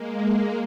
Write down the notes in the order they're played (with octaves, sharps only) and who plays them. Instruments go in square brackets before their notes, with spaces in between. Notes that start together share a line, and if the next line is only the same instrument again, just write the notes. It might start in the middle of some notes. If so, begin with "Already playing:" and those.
Already playing: [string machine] G#3 A#3